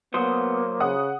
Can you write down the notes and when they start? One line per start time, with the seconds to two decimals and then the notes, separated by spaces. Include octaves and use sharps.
0.14 F#3 A#3 B3 C5 D#6
0.80 C#3 F#5 D#6